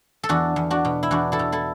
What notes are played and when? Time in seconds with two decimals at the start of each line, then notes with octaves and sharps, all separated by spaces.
0.23 A4
0.29 E2 D4 F#4
0.56 E2
0.70 D4 F#4
0.85 B2
1.03 E4
1.11 E2 D4 F#4
1.32 E4 A4
1.39 B2
1.52 E4 A4